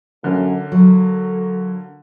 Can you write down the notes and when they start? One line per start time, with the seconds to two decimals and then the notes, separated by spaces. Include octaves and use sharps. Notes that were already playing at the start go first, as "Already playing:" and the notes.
0.24 F#2 D3 A#3
0.72 F#3 A4